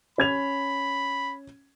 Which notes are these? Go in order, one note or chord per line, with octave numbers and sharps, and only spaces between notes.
C#4 B5 G#6 F7